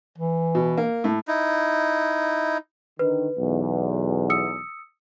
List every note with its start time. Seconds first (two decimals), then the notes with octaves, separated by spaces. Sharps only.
0.18 E3
0.55 B2
0.77 A#3
1.04 A2
1.28 D#4 E4
2.99 D3 D#3 B4
3.38 B1 E2
4.30 D#6 E6 C#7